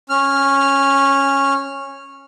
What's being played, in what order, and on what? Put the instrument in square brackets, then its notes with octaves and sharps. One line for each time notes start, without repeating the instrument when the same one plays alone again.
[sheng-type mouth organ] C#4 F6